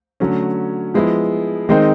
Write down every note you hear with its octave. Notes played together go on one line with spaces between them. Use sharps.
D3 F#3 A3 C#4
F3 G#3 B3 E4
D#3 G#3 C4 D#4